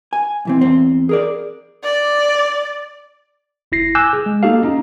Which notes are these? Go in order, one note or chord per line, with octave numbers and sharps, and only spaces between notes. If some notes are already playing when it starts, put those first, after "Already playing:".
G#5
B1 E3 C4
E2 C4
G#4 A#4 D5
D5
G1 E4 A#6 C7
G#5 D6 E6 F#6 G6
G#4
G#3
A#3 D#4 F#4 G4 A4 F5
C#4 D#4